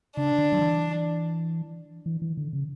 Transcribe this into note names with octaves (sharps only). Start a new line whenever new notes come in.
C#3 D4
D3
F#3
E3
E3
E3
D3
C#3